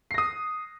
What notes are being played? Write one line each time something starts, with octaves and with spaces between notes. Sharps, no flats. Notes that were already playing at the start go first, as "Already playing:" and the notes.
D#6 A#6 C7